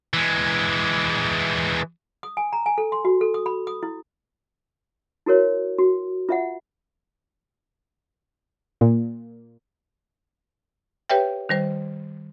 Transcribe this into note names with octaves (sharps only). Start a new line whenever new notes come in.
E3 G#3
D#6
G#5
A#5
G#5
A4
C6
F#4
A4
D#6
B5
D#6
E4
E4 F#4 A#4 C#5
F#4
F4 E5 F#5
A#2
G4 B4 C#5 E5 G5
D#3 G3 C5